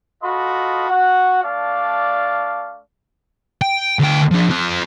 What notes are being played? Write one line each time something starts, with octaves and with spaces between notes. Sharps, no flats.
F4 F#4 A4 D#5 B5
F#4 F#5
A3 D4 D5 F5
G5
D2 G5
F3 D4
C4 F4